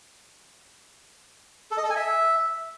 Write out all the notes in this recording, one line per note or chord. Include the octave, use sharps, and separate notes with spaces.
A4
D#5
A4
G#5
E5